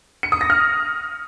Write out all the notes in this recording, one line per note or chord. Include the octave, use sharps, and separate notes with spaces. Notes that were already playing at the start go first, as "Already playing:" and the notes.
C#7
D#6
A#6
F6